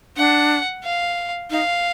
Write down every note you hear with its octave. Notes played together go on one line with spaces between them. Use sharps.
D4 F#5
F5
D#4 F5